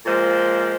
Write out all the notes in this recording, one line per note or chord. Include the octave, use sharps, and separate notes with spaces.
A#2 F3 G#3 C5